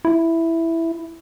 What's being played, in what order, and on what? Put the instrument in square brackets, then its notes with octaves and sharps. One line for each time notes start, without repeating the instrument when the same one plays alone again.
[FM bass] E4